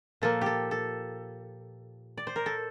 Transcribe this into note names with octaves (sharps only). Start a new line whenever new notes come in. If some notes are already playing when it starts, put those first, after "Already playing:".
A#2 F3 A#3 A4
G4 A4
A4
D5
C5
A#4
A4